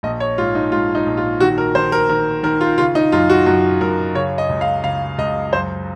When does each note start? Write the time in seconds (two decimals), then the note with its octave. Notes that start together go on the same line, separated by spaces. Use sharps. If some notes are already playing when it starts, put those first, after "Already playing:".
0.03 A#1 D#5
0.20 C#5
0.38 G#2 F4
0.55 D#4
0.71 G#2 F4
0.95 D#4
1.06 A#1
1.17 F4
1.40 D#3 F#4
1.58 A#4
1.75 D#3 C5
1.92 A#4
2.09 D#3 A#4
2.43 D#3 A#4
2.61 F4
2.78 C#3 F4
2.95 D#4
3.12 F#2 F4
3.30 F#4
3.46 F#2 F#4
3.81 F#2 A#4
4.15 C#3 C#5
4.38 D#5
4.49 C#2
4.61 F5
4.84 C#3 F5
5.18 C#2 D#5
5.53 F#2 C5